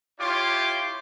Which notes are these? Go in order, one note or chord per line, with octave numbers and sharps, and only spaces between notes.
E4 F4 G4 C#5 C6 D6